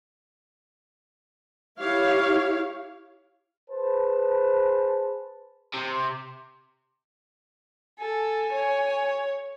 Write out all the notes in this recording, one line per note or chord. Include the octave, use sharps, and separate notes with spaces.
E4 G4 C#5 F5
G#4 B4 C5 A5
C3
A4 G#5
C#5